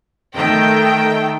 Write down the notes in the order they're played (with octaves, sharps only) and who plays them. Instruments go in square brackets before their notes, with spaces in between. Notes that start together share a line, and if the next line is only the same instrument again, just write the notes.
[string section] D#3 A3 G5